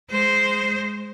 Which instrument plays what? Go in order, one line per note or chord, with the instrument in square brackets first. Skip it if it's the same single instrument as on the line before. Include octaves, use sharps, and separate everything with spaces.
[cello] G#3 C5